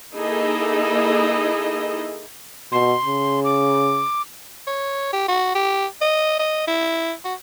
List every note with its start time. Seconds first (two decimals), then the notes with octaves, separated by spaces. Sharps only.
0.14 A#3 D#4 E4 G#4 A4 D#5
2.72 B2 C6
3.05 C#3
3.44 D6
4.67 C#5
5.13 G4
5.28 F#4
5.55 G4
6.01 D#5
6.39 D#5
6.68 E4
7.25 F#4